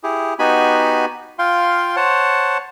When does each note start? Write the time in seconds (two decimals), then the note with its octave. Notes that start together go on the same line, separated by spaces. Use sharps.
0.03 E4 G4 G#4
0.39 B3 D#4 F#4 G4 G#5 B5
1.39 F4 F5 G5 C6
1.96 C5 C#5 F#5 A5